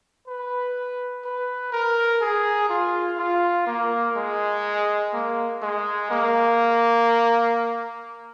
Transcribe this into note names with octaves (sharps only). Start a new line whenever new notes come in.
B4
B4
A#4
G#4
F4
F4
A#3
G#3
A#3
G#3
A#3